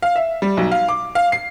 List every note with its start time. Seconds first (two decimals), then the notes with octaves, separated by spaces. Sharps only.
0.02 F5
0.16 E5
0.42 G3
0.57 B1
0.71 F5
0.88 D6
1.15 F5
1.32 C7